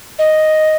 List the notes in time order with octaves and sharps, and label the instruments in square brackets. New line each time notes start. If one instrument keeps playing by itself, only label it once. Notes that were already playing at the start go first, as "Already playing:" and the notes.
[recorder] D#5